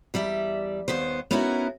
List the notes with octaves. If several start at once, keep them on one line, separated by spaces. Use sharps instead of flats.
E2 G3 D5 E5
D#2 D#3 B3 C5
B3 C#4 D#4 E4 F#4 A#4